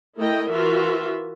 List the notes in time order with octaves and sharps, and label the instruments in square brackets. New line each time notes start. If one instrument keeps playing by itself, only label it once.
[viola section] A3 E4 A#4 D#5 G5
E3 F4 F#4 A#4 E5